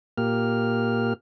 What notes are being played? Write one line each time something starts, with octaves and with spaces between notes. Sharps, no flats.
A#2 A#3 G4 F6